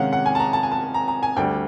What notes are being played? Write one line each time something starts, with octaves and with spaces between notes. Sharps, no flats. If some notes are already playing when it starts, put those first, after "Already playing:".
Already playing: C3 D#3 G#3 C#4 F5 F#5
F#5
G#5
A5
A#5
A5
G#5
A5
A#5
A#5
G#5
D2 D3 G3 G5